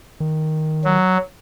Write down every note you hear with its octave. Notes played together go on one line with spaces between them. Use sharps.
D#3
F#3